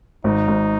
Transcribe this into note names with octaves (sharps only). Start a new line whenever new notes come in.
G#1 D#4
G#1